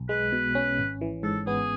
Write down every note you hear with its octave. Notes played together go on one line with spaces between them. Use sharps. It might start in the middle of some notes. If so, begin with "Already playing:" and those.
Already playing: B1
G#3 B4
B2
C#4
G#1
E3
G#2 A4
B3 G#4